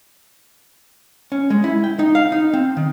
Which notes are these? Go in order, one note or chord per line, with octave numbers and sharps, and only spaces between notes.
C#4
G#3
E4
G5
D#4
F5
D#4
C4
D#3